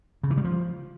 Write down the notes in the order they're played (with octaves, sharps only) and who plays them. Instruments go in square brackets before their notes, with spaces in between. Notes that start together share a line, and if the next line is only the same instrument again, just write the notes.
[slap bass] C#3
E3
G3
F3